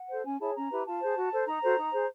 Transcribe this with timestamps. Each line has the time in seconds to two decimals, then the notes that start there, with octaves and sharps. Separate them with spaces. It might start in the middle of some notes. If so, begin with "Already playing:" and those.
Already playing: F#5
0.09 A4 C5
0.24 C#4 G#5
0.40 E4 G#4 C#5 A5
0.55 C#4 A#5
0.71 E4 G4 B4
0.86 F4 A5
1.01 G#4 C5
1.16 F#4
1.32 A4 C5
1.47 D#4 A#5
1.62 F#4 A4 C5
1.78 D#4
1.93 G#4 C5